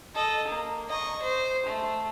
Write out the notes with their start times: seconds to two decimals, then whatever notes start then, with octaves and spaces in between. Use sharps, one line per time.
0.15 A4 D#5
0.48 A#3
0.89 D#5 C#6
1.22 C5
1.66 A3